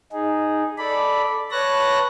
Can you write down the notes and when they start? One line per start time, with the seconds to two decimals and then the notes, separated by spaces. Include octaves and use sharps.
0.13 D#4 G#4
0.78 A4 D5 B5
1.51 B4 C#5 A5 F#6 A#6